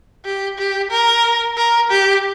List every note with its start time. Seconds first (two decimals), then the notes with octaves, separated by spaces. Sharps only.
0.25 G4
0.58 G4
0.91 A#4
1.57 A#4
1.90 G4